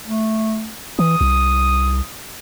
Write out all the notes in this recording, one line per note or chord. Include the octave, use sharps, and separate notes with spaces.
A3
E3 D#6
C2